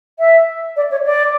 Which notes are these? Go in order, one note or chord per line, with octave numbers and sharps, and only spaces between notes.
E5
D5
C#5
D5